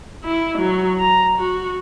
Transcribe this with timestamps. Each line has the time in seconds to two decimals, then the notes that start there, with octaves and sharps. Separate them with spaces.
0.24 E4
0.59 F#3
1.00 A#5
1.39 F#4